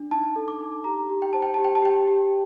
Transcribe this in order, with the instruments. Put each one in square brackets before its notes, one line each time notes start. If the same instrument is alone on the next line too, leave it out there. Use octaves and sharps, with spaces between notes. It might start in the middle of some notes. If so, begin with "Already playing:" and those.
Already playing: [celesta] D4
D#4 A5
A4
D6
D#4
G4 A#5
G4
G5
C5 A5
G5
G4 A5
G5
A5
G4 G5
G4